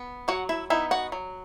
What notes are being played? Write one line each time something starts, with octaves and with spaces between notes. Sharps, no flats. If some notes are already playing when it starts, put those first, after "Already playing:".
Already playing: B3
F#3 F#4 F#5
E4 E5
B3 D#4 E4 E5
F#4 F#5
F#3